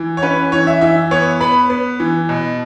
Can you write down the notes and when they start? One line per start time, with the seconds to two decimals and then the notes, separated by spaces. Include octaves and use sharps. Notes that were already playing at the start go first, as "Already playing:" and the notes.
Already playing: E3
0.17 C#5
0.22 C#4 B4
0.52 E3 C#5
0.67 E5
0.81 E3 E5
1.11 B3 C#5
1.41 B3 B5
1.70 B3
2.00 E3
2.29 B2